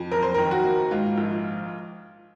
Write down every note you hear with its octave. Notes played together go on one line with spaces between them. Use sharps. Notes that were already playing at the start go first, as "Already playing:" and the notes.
Already playing: F2
F#1 A#4
C5
D#3 A#4
F#4
A#3
G#2 F4
A#1